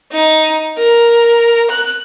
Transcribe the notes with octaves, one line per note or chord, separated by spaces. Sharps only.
D#4
A#4
F#6